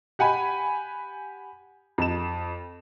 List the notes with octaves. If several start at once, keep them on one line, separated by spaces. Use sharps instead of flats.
G4 F#5 G#5 B5
F2 E7